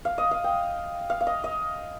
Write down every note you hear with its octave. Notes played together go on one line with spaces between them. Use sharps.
F5
D#5
F5
G5
F5
F5
D#5
D#5